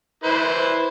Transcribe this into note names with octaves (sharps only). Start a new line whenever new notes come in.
E4 B4 C5